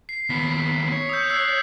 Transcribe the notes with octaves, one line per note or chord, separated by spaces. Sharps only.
C7
D#2 B3 B6
C#5
D#6 E6 G6
E6 F#6 C7